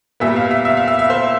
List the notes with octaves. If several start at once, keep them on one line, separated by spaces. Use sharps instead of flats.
A#2 G3 B3 E5
F5
E5
E5
F5
E5
E5
C5